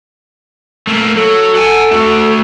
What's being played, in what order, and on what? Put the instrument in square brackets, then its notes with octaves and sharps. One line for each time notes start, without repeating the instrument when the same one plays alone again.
[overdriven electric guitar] A3 A#3
[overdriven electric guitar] F#3 [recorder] A4
[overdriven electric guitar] F#5 G#5
A3 F#4